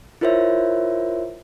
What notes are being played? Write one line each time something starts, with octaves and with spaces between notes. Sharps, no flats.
E4 F4 A#4 C5 C#5 E5